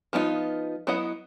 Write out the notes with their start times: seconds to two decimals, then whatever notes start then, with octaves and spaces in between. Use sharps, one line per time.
0.13 F3 B3 D4 D#4 F4
0.87 F#3 B3 E4 D#5 F#5